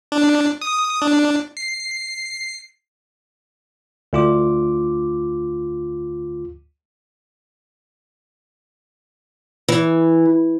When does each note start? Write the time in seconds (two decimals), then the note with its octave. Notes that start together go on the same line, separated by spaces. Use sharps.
0.12 D4
0.61 D#6
1.02 D4
1.57 C7
4.13 D2 F4 D6
9.69 E3